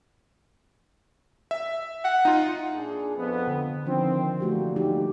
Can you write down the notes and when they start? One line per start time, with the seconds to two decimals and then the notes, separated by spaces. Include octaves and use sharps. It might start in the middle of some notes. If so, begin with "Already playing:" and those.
1.51 E5
2.04 F#5
2.25 D#4 F4
2.74 A#2 D4 G#4
3.16 F2 B3
3.47 D3
3.86 D#3 F3 C4 D4 F4
4.40 A#2 E3 A3 F#4 G4
4.76 D#4 F4 G4